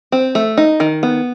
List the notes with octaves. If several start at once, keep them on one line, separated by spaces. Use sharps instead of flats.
C4
A3
D#4
D#3
B3